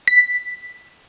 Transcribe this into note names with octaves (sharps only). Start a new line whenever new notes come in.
B6